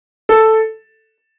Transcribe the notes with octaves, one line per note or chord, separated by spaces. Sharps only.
A4